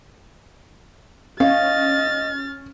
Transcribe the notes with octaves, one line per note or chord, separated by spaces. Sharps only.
C#4 D#5 F5 F6 A6